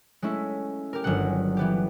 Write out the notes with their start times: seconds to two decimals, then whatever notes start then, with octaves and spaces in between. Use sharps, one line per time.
0.22 G#3 A3 C#4 E4
0.93 G4 A#4
1.04 G1 D#3 F#3 G#3 F#5
1.57 E3 B3 G4